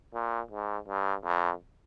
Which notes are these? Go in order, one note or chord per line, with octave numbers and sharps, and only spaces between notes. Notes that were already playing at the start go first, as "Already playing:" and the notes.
A#2
G#2
G2
F2